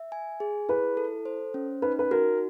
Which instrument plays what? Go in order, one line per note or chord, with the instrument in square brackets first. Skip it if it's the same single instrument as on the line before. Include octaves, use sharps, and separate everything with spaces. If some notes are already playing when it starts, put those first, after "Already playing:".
Already playing: [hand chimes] E5
G#5
G#4
[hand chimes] E4 [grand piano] B4
[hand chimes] A4
C5
C#4
[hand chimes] D#4 [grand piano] B4
[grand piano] B4
[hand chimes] F#4 [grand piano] A#4